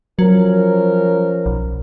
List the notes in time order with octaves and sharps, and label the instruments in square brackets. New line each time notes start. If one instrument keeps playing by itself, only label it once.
[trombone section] F3 C#4 A#4 [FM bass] F#3
[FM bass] B1